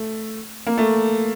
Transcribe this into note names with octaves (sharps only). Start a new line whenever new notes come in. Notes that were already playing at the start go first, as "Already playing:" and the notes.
Already playing: A3
A#3
A3